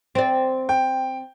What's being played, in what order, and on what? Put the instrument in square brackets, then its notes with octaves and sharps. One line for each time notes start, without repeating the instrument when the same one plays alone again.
[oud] C4 D5
[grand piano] G5